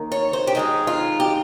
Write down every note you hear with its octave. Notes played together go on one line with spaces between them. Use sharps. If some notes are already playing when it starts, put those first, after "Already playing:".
Already playing: D#2 D#3 A#3
C#5
C5
G4
D#2 D#3 G#3 D#4 G#4
F4
G4